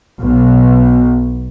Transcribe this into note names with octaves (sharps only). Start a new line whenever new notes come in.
B1 B2